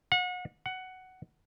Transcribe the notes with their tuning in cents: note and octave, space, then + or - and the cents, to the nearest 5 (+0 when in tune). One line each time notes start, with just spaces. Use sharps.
F#5 -35
F#5 +10